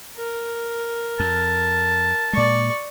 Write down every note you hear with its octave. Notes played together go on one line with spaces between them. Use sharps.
A#4
F2 A5
A#2 G#3 D5 C#6